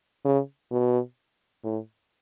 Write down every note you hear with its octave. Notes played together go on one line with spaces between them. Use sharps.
C#3
B2
A2